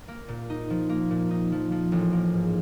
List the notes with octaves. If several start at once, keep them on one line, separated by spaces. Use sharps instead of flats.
A#3
A#2
D#4
F3
A#3
A#2
D#4
F3
F3
A1
A#3
G#2